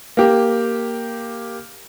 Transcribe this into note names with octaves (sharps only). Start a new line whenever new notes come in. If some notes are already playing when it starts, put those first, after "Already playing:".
A#3 G4